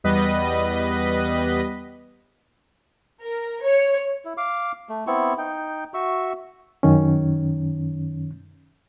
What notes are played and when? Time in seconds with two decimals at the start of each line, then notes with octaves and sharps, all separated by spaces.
0.04 E2 G3 B3 B4 D#5 B6
3.21 A#4
3.62 C#5
4.25 E4
4.37 F5 D6
4.89 A3
5.07 B3 C4 E4 C#6
5.38 D#4 G5
5.94 F#4 E5 C#6
6.83 F#2 D#3 C#4